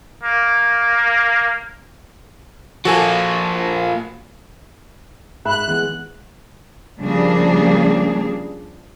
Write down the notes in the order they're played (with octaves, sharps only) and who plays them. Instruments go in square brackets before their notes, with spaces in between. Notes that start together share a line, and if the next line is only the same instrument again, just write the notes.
[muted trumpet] A#3
[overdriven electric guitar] F3 A#3 [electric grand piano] F#4 A4 G#5
[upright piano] G#2 E5 B5 [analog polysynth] F#6
[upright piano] E3 G#3 B3
[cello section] C#3 F3 G3 A#3 D4 G#4